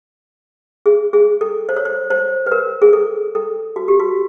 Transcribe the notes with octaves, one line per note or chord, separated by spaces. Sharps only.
G#4
G#4
A4
C5
C#5
C5
C5
B4
A#4
G#4
A4
A4
F#4
G4
F#4